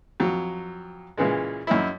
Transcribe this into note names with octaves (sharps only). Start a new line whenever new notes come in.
F2 F#3
A#2 C#3 E3 G#3
F#2 D#4 E4